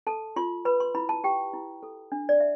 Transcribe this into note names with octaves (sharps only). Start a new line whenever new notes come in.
A4 A5
F4 C6
B4 B5
C6
E4 B5
A5
G4 G5
E4
A4
D4
D5
E5